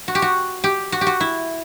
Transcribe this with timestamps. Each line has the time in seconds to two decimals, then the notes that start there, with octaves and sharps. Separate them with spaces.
0.08 F#4
0.15 G4
0.22 F#4
0.64 G4
0.92 F#4
1.01 G4
1.07 F#4
1.20 E4